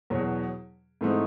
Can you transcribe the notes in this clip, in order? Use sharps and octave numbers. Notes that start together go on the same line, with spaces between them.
E2 B2 F#3
G#2 E3 A3 C4 D#4